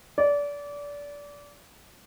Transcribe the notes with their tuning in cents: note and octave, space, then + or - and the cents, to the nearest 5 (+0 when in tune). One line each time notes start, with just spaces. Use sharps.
D5 -25